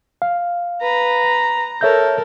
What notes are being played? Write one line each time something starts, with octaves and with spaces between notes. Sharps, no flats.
F5
B4 A#5
A4 A#4 C#5 E5 G6